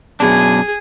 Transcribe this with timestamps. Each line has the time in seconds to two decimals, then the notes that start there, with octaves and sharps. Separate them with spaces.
0.20 F#2 B2 D4 G#4